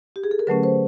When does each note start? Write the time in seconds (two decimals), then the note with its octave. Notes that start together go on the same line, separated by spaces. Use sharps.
0.16 G4
0.24 G#4
0.31 A4
0.39 A#4
0.47 D3 F#3 A3 C#4 B4
0.63 C5